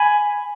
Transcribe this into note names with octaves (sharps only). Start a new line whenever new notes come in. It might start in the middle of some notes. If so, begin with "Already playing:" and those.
Already playing: G#5 B5